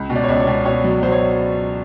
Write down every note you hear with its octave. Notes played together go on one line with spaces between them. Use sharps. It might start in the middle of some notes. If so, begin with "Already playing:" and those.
Already playing: C#2
B2
D5
C#5
C#2 D5
C#5
B2
B2 C#5
F#3
F#3 C5
C#5